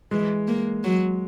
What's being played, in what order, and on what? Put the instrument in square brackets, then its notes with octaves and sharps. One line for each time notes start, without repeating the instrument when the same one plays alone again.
[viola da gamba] E3 [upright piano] G#3
[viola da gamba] A#3
F#3